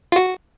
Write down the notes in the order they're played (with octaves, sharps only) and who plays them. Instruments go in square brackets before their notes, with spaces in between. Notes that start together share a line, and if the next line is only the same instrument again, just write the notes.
[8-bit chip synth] F4
F#4